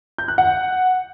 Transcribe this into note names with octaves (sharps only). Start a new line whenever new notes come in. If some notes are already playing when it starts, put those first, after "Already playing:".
G6
F#6
F#5